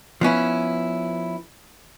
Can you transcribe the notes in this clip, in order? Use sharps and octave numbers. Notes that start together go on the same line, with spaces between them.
F3 B3 C#4 E4